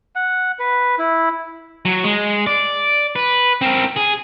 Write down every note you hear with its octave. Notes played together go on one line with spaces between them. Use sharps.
F#5
B4
E4
F#3
G#3
D5
B4
C4 A#4
G#4